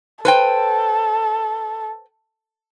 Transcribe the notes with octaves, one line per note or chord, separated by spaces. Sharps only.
A4 B4 C5 G5